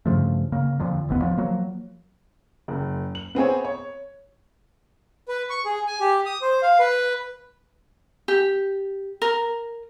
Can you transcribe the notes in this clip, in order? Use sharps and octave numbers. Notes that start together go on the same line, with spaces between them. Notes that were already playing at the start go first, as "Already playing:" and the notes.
G2 C#3 F3 A3
C#3 A#3
F2 D3 F3
E1 A1 D#2 B3
F3
F3 F#3 A#3
F#1
F#7
B3 C4 G#4 C#5
C#5
B4
C#6
G#4
G#5
G4
D#6
C5
F5
B4
G4
A#4